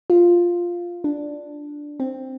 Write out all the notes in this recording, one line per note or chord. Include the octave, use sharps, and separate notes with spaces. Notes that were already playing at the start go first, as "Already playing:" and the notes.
F4
D4
C4